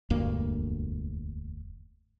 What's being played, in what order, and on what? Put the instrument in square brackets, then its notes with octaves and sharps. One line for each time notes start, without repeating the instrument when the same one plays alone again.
[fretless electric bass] E1 D2 G2 A#3